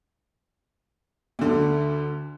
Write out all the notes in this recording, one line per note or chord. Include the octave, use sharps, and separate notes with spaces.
D2 D3